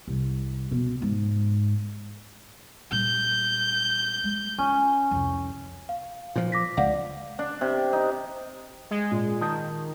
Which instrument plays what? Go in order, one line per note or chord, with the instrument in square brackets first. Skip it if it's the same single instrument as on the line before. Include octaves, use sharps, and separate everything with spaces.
[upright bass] C2
B2
G#2
[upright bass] A#2 G3 [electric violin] G6
[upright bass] G#3
[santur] C#4 [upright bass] F4
[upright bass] C2 F2
[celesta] F5
[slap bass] A#2 F3
[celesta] D6 A#6 B6
[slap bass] C#2 [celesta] D5 F5 F#5
[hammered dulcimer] D4
C3
D#4
[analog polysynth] G#3
[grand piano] A#2
[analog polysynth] D#3 [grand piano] A5 D#6 G6